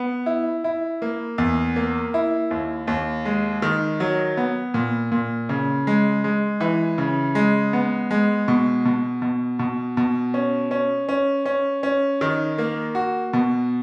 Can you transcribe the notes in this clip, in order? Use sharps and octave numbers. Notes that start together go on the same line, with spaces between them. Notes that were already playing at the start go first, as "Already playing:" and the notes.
Already playing: B3
E4
E4
A#3
E2
A#3
E4
D#2
D#2
G#3
D#3
F#3
B3
A#2
A#2
C#3
G#3
G#3
E3
C#3
G#3
B3
G#3
B2
B2
B2
B2
B2
C#4
C#4
C#4
C#4
C#4
D#3
A#3
F#4
B2